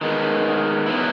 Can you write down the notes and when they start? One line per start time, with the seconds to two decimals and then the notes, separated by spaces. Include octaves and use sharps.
0.01 D#3 G#3 B3
0.86 B2 F#3 B3 E4